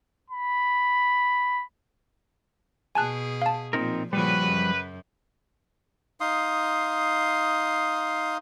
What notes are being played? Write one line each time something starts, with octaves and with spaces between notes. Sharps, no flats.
B5
B2 G#4 G#5 A5 F#6
F5 A5
A#2 F3 C4 D#4 A#4
A#2 C#3 F3 G3 F#4 B4
F#2
D#4 F5 C6 D#6